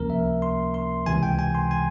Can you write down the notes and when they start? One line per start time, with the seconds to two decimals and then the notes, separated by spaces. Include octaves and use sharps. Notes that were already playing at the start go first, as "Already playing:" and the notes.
Already playing: C#2 C3 F3 A#3 C#4 A#4
0.10 E5
0.42 C6
0.74 C6
1.06 C#2 C3 E3 G#5
1.23 G5
1.39 G#5
1.55 C6
1.71 G#5